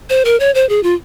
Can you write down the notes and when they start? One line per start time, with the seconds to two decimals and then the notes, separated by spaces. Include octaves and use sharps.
0.10 C5
0.25 A#4
0.40 C#5
0.54 C5
0.69 G#4
0.83 F4